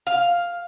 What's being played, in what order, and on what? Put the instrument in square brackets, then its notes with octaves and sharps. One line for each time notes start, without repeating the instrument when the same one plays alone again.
[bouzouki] F5